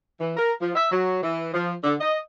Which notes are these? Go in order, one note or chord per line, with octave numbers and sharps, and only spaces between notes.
E3
A#4
F3
E5
F#3
E3
F3
D3
D#5